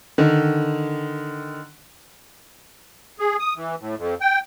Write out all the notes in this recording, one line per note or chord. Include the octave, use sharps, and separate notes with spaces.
D3 D#3
G#4
D#6
E3
A2
F2
G5